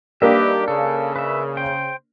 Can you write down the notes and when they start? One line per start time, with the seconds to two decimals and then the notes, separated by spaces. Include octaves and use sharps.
0.22 G3 A#3 D4 D#4 G4 B4 D#5 E5
0.68 C#3 A4
1.16 B4 E5
1.57 C5 G5